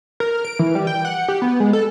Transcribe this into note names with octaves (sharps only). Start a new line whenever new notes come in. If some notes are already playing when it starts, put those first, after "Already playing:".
A#4
D7
E3
G3
G5
F#5
G4
B3
G#3
A4